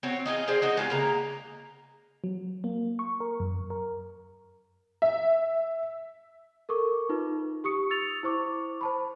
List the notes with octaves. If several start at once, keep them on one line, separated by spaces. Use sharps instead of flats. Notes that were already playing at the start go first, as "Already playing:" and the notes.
C4 F#4 C#5
D#4 F4 G#4 D#5
C4 G#4 C5 D5
D#4 F#4 D#5
G#3 F4 G4
C#3 A#3 A#5
F#3
A#3
C#6
A#4
F#2
A#4
E5
A4 A#4 C#6 D6
D#4 F4 B4
G4 C#6 D#6 C#7
E6 A6 F7
E4 C5 C#6 D6
C5 A5 B5